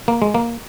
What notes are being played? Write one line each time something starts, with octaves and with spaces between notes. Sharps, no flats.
A#3
G#3
A#3